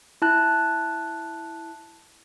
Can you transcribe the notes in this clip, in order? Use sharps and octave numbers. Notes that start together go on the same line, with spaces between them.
E4 A5 F#6